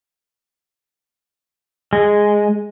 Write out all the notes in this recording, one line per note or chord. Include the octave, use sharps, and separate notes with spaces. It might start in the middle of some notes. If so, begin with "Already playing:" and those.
G#3